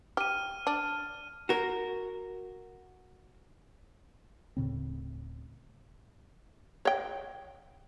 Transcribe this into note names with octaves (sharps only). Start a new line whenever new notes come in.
G4 F6 D#7
D4
F#4 A#4
D1 A2 C#3 C4
C#5 G5